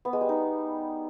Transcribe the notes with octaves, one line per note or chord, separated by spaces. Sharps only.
B3
G#3
G3
D#4